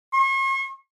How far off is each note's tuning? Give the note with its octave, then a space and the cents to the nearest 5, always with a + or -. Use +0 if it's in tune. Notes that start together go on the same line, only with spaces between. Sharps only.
C#6 -45